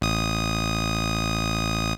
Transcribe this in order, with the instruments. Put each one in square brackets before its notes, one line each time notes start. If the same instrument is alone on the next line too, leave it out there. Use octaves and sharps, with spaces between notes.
[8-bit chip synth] A1 D#6